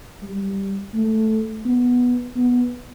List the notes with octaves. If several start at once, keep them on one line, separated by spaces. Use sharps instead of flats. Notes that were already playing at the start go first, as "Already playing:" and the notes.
G3
A3
B3
B3